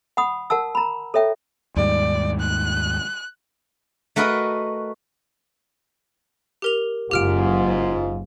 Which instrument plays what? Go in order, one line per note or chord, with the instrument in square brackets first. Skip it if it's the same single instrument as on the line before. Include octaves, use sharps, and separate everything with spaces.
[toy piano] F#5 B5 D#6
A#4 F#5 A5 E6
A#5 B5
A4 C#5 E5 G5
[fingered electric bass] D#2 G#2 G3 [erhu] D5
[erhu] F#6
[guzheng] A3 F#4 A#4 B4 D#5
[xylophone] G4 A#4 F7
[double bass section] F#1 [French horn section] G#2 F4 [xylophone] G4 F6 D7